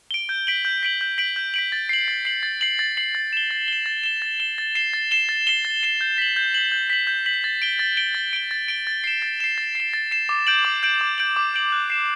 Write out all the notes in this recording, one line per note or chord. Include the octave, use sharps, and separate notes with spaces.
D7 G7
G6
B6 D7 F#7
G6
B6 D7 F#7
G6
B6 D7 F#7
G6
B6 D7 F#7
A6
C7 F#7
A6
C7 F#7
A6
C7 F#7
A6
C7 F#7
A6
E7 G7
A6
E7 G7
A6
E7 G7
A6
E7 G7
A6
C7 E7 G7
A6
C7 E7 G7
A6
C7 E7 G7
A6
C7 E7 G7
G6
B6 F#7
G6
B6 F#7
G6
B6 F#7
G6
B6 F#7
A6
D7 G7
A6
D7 G7
A6
D7 G7
A6
D7 G7
A6
C7 E7
A6
C7 E7
A6
C7 E7
A6
C7 E7
D6
G6 D7 F#7
D6
G6 D7 F#7
D6
G6 D7 F#7
D6
G6 D7 F#7
F#6
C7 E7